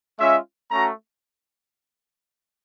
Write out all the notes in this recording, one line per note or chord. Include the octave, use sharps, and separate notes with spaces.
G#3 C#4 F4 E5
A3 C#4 F#4 A#5